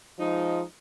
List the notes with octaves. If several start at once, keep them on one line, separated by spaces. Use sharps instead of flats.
F3 G#3 D#4